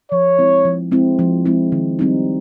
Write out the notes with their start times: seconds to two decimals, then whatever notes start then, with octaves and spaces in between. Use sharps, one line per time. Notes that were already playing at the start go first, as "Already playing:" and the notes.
0.11 F3 C#5
0.39 G#3 C4 E4
0.65 F3
0.92 G#3 C4 E4
1.19 F3
1.46 G#3 C4 E4
1.72 D#3
1.99 G3 C4 D#4